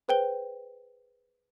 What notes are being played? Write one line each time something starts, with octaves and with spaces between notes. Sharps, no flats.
G#4 B4 C5 G5 G6 G7